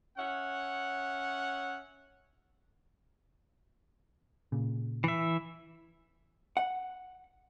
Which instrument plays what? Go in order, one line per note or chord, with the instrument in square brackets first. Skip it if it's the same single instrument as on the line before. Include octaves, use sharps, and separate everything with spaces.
[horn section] C#4 C#5 E5 F#5
[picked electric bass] A#2 C#3
[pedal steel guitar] E3 E5
[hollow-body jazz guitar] F#5